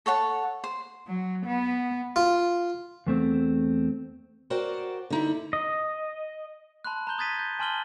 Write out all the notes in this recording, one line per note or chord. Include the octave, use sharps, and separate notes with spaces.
A4 C#5 F#5 A5
C5
F#3
B3
F4
E2 A3 C4
F#4 A#4 C5 D5 F#5 G5
D3 D#4 E4
D#5
A5 B5 C6 F#6
A#5 C6 G6 G7
D#6 G#6 A6 B6 D#7
G6
G#5 A5 C6 F6 D#7 G7